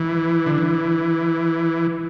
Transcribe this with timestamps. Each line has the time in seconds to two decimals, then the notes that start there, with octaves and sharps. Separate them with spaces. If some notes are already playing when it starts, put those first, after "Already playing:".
Already playing: E3
0.46 D3
0.58 E3